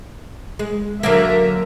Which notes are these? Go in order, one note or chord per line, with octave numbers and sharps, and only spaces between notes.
G#3
D3 F#3 A#3 A#4 E5